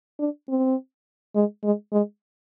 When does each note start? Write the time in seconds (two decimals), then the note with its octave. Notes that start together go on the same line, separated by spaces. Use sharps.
0.19 D4
0.49 C4
1.35 G#3
1.64 G#3
1.92 G#3